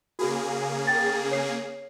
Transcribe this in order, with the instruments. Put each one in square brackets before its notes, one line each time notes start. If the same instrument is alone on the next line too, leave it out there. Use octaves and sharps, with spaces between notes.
[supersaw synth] C#3 A#3 G#4 [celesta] F#4
[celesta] G5 A6
C#5 C7